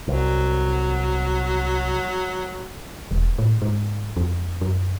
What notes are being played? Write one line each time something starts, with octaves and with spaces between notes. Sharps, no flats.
C2 F#3
E1
A2
G#2
F2
F#2